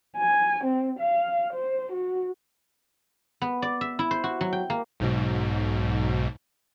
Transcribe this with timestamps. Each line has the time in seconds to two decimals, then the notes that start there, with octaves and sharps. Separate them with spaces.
0.17 G#5
0.64 C4
0.99 F5
1.53 C5
1.92 F#4
3.42 B3
3.62 D5
3.81 E5
3.99 E4
4.11 C5
4.24 F#4
4.41 F#3
4.53 G5
4.70 A#3
5.00 B1 G#2 B2